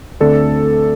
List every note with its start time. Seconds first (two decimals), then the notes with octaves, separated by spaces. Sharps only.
0.20 D2 D3 A3 C4 A4 D5